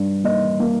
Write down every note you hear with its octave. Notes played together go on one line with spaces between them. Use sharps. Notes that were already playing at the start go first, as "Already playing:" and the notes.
Already playing: G2 D4
A#3 D#5
A#3